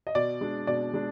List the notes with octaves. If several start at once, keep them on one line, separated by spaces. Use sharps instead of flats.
D#5
B2 D5
G#3 D4
B2 D5
G#3 D4